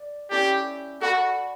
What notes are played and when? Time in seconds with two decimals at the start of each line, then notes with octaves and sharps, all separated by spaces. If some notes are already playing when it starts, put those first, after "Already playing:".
Already playing: D5
0.30 C#4 E4 G4 A4 D5
1.01 F#4 A4 D5 F#5 B5